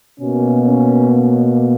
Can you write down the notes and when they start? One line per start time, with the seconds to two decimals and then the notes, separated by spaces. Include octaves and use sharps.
0.18 B2 A#3 C#4
0.67 C#4